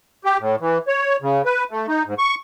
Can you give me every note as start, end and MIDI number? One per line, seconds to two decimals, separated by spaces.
0.24 0.37 67
0.40 0.56 45
0.60 0.78 52
0.88 1.16 73
1.22 1.42 49
1.45 1.64 71
1.71 1.86 57
1.88 2.03 63
2.06 2.14 44
2.18 2.35 85